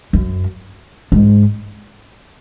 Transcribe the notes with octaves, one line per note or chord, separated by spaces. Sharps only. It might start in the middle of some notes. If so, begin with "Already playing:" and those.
F#2
G#2